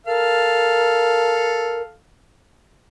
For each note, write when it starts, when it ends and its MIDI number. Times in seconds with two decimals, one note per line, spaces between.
0.07 1.94 69
0.07 1.82 70
0.07 1.94 77